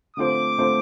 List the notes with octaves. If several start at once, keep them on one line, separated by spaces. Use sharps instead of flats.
D3 A3 C4 F4 C5 D6
D3 A3 C4 F4 C5